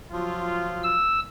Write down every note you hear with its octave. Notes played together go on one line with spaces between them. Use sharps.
F3 F#3 F4
E6